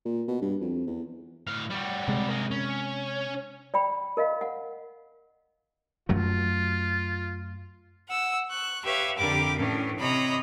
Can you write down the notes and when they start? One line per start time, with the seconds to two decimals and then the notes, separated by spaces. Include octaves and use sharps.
0.05 A#2
0.28 B2
0.41 G2
0.61 F2
0.86 E2
1.47 A2 F5
1.70 G3 F#4
2.08 C3 G#3
2.29 A#3 G#4
2.51 C#4
3.74 D5 G5 B5
4.17 A#4 D#5 F5
4.41 F#5
6.09 F#2 F#3 A3 F4
8.09 F#5 E6
8.51 C#6 F#6
8.83 G4 B4 C#5 E5 F5
9.17 F2 D3 G4 A#4 B5 D6
9.57 A2 E3 C#4 D4
9.98 C3 C#5 D#5 A#5 B5